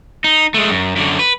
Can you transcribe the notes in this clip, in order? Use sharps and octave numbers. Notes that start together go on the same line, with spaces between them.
D#4
G#3 A3
F#2
F#2 D3
B4